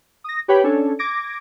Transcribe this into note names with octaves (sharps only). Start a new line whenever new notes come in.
D#6 A#6
G4 B4 C#5 G5 B5
C#4 D4 A4 C#5
D6 G#6 A#6 D7